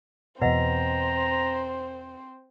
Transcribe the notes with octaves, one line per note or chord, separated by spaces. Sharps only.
E2 B2 C4 B4 C5 D#5 F#5 A#5